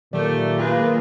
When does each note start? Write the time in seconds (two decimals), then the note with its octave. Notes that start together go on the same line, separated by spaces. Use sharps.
0.13 A#2 D#3 F#3 A3 G4 D5
0.59 A#3 F4 G#4 B4